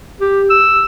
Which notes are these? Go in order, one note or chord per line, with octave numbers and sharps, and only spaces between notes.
G4
E6